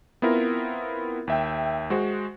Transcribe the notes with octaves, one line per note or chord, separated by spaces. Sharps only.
B3 C4 E4 F4 A#4
D#2 E5 G5
G#3 F#4 C5